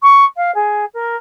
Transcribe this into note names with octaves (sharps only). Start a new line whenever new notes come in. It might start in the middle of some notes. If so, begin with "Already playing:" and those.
C#6
F5
G#4
A#4